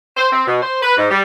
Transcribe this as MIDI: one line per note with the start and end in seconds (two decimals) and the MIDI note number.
0.17 0.27 72
0.32 0.46 60
0.47 0.59 47
0.61 0.82 72
0.82 0.96 71
0.97 1.08 44
1.10 1.22 55